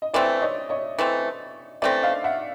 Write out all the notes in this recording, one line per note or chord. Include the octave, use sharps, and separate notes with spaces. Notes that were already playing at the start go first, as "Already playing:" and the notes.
D#5
E3 A3 C4 D5 E5
C#5 D#5
C#5 D#5
E3 A3 C4
E3 A3 C4 D5 E5
D#5 F5
E5 F#5